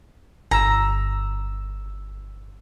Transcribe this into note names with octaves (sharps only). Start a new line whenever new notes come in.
G1 A#5 E6